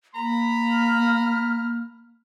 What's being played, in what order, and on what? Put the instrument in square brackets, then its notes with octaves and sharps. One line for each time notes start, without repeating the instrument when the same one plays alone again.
[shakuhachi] A#3 [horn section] A#5 B5
[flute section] F6